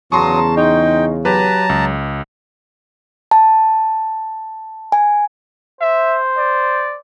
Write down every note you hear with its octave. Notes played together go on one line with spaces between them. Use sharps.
E2 C#3 F#3 A5 A#5 C6 C#6 D#6
D#4 G5
F#3 G4 B4 A5 A#5
C#2
A5
G#5
C5 E5
D5